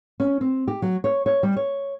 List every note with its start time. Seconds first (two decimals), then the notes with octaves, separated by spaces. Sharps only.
0.20 C#4
0.41 C4
0.68 G4
0.82 F#3
1.04 C#5
1.26 C#5
1.43 G3
1.56 C#5